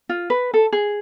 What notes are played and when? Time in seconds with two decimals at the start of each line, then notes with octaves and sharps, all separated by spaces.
0.09 F4
0.30 B4
0.54 A4
0.73 G#4